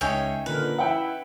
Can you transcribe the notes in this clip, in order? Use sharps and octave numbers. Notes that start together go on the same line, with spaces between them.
C#2 C#4 D#4 G#4 C#5 E5 G5
A#2 D3 A#4 B4
E4 E5 F#5 G5